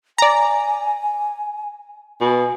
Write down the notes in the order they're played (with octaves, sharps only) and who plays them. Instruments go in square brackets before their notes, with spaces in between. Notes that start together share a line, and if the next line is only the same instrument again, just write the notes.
[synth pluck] D5 A#5 [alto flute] G#5
[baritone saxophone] B2 [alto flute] G#5